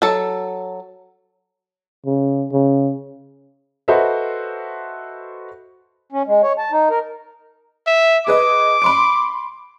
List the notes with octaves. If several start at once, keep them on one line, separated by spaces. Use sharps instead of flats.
F#3 A4
C#3
C#3
F#4 A4 B4 C5 D#5 E5
C#4
G#3
C#5
A5
D#4
A#4
E5
G#4 B4 D#5 D6
B5 C6 D7